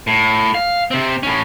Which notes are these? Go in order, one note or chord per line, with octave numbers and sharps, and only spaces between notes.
A2
F5
C3 C4
A2 C#4